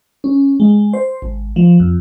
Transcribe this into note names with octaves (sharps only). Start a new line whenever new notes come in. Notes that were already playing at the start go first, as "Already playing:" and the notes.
C#4
G#3
C5
G#1
F3
F2